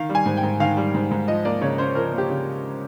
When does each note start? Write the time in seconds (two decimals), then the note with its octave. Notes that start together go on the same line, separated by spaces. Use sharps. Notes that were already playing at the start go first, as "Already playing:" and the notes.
Already playing: D#3 F5
0.09 G3
0.15 G#5
0.26 G#2
0.37 G5
0.43 G#2
0.60 D#3 F5
0.77 G3
0.94 G#2
1.11 G#2
1.28 F3 D#5
1.45 A#3 D5
1.61 C#3 C#5
1.78 C#4 C5
1.95 F3 A#4
2.12 A#3
2.18 G4
2.29 C#3